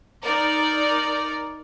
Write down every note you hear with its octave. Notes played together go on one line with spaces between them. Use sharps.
D#4 A#4 D5